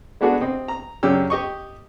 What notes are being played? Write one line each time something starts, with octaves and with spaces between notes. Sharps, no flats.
G#3 B3 D4 F#4 G#4 A4
C3 C4 D#5
A#5
F#2 C#3 C#4 D4 G4 E6
G4 D#5 C#6